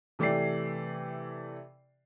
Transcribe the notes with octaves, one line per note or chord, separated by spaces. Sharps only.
C3 E3 A3 G4 D5 C7